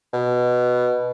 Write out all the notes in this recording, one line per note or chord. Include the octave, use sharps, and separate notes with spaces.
B2